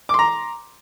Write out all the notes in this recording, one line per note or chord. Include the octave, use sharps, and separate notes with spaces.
A#5 C6 D6